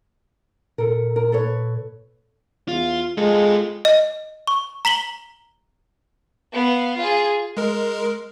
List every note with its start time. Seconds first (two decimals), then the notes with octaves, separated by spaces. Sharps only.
0.78 A#2 A4 A#4
1.16 A#4
1.32 A4 B4 C#5
2.68 E2 F4
3.17 G#3 F4 A4
3.85 D#5
4.47 C#6
4.85 A#5 B6 F#7 G7
6.53 B3 F5
6.97 F4 G#4
7.57 G#3 A#4